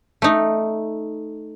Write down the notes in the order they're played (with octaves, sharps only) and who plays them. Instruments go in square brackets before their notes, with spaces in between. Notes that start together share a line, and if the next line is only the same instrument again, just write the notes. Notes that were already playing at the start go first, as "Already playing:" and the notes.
[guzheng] A3 D#4